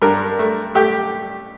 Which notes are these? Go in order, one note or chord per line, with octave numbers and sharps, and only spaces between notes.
G2 A#4
A3
A3 G4